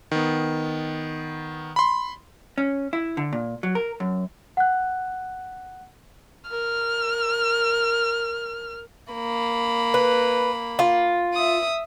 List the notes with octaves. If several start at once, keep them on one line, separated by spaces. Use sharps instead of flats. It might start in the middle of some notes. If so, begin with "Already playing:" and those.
D#3 B3
B5 C6
C#4
E4
D3
A#2
F#3
A#4
F#2
F#5 F#6
A#4 F6
A#3 B5
B4
F4
E5 D#6